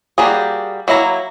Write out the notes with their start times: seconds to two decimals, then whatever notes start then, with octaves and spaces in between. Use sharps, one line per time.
0.18 G3 A#3 F#4 G#4
0.88 F#3 A#3 E4 A4 A#5